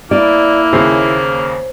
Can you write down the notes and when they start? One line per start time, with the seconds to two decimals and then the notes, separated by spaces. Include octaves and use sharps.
0.11 A#3 E4 D5
0.73 D#2 C#3 G#4 C5 C#5